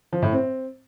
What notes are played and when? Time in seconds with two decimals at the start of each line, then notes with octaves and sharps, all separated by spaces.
0.13 F3
0.22 A2
0.32 C4